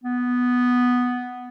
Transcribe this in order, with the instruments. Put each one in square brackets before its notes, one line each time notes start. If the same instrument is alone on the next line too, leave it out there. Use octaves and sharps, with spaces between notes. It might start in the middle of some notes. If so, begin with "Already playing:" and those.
[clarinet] B3